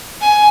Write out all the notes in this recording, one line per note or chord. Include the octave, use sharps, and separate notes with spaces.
G#5